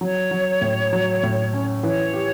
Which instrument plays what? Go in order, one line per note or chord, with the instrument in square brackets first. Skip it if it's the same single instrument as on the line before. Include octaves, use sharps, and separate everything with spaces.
[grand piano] F#3 [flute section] C#5
[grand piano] F#3
A2
F#3
A2
C#4
[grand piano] E3 [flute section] C#5
[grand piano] G4